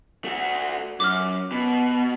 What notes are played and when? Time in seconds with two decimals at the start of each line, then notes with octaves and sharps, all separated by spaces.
0.24 A3 F#4
1.00 F#2 D6 F6
1.52 B2